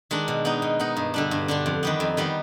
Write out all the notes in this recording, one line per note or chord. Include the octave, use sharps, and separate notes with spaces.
D#3 G#3 D4
B2
B3 D#4
B2
B3 D#4
G2
D3 G3 D4
G2
D3 G3 D4
F2
D#3 G3 B3
F2
D#3 G3 B3